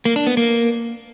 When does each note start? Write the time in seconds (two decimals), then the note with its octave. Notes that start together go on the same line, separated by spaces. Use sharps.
0.05 A#3
0.16 D4
0.27 B3
0.37 A#3